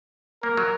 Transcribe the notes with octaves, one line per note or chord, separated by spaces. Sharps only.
A#3 A#4
F#3